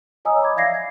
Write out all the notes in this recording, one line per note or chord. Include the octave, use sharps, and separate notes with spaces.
C#5 D#5 G#5 A#5 D#6 E6
B5 D6 G#6
D5 E5 F5 G#6 A#6 C7
G#6